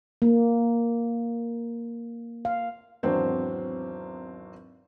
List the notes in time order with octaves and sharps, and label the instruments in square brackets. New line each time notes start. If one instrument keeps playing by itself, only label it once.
[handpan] A#3
F5
[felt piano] G#1 E2 F#3 C4 D4 C5